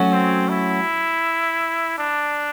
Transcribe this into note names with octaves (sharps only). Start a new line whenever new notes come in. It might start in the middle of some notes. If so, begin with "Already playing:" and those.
Already playing: F#3 A3 C#4 F#4
C4
E4
D4